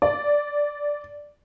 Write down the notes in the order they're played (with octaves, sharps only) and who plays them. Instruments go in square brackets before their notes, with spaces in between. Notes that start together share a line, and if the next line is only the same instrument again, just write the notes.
[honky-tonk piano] D5